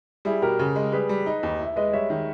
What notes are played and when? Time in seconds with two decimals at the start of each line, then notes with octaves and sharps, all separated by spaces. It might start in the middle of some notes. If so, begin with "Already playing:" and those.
0.25 G3 E4 G#4
0.42 B2 G4 A#4
0.59 C#3
0.76 G#3
0.92 G3 G#4 B4
1.09 G3
1.26 D#4
1.43 D#2
1.59 E4
1.66 E5
1.76 G#3 B4 D#5
1.93 G3 C#5 E5
2.10 D#3